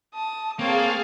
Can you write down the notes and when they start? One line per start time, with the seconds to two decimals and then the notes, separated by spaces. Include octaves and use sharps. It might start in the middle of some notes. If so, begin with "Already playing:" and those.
0.15 A5 D#6
0.59 A#3 C4 G#4 A4 C#5 F5 A5